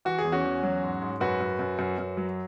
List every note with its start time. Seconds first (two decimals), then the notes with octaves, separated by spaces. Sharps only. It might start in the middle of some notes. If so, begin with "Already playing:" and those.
0.05 E3 F#4
0.18 G#4
0.24 E2
0.32 C#4 F#4
0.44 E2
0.63 F#3
0.82 G#2
1.02 G#2
1.20 F#2 F#4 B4
1.41 F#2
1.59 F#2
1.79 F#2
1.98 F#2
2.17 F#3